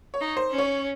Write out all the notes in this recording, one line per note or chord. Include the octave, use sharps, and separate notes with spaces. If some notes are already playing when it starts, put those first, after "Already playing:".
C#5
D#4
C5
C#4
C#5